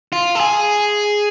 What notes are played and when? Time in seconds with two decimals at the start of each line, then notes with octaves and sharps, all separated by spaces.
0.13 F4
0.35 A4
0.40 G#4